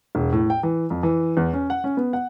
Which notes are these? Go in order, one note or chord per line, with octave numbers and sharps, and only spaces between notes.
E1
A2
G5
E3
F2
E3
E2
C#4
F#5
C#4
B3
F#5